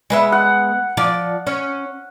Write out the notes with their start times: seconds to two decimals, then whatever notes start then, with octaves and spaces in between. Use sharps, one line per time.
0.10 G#3 B3 E5
0.32 F#5
0.97 F3 D5
1.47 C#4